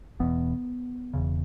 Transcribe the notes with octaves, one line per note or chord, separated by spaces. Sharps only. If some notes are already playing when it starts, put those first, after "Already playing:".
E1 E2 B2 B3
E1 E2 C#3